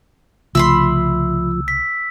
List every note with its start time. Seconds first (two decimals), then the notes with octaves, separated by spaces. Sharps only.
0.55 C2 C#3 F3 A3 E5 B5 C6 E6
1.68 B6